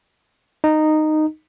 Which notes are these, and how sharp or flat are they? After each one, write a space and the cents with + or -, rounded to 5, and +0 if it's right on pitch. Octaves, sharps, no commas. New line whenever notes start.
D#4 -10